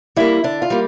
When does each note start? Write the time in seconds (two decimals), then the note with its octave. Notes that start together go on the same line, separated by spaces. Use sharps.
0.16 G3 A#3 E4
0.44 D3 D4
0.62 F4
0.70 G3 A#3